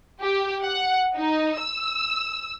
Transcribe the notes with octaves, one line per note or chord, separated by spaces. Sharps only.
G4
F#5
D#4
E6